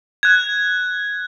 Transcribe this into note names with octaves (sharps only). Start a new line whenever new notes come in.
F#6 G#6